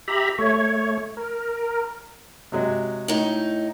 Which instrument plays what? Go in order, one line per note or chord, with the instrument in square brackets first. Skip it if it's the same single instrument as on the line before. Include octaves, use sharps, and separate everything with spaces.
[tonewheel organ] G4 E5 A#5 B5
A3 C#5
A#4
[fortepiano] C3 F#3 G#3
[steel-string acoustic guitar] A2 D#4